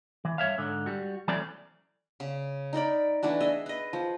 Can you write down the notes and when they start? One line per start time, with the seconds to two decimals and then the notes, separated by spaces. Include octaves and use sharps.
0.25 E3
0.38 G2 C#5 E5 F5
0.58 G#2 D3
0.86 G3 F#4
1.28 E3 F#3 A3 C4 C#4 D5
2.20 C#3
2.73 D#4 A#4 D5 B5
3.23 E3 A3 D4 F#4
3.40 G#4 D#5 E5
3.66 B4 D#5
3.93 F3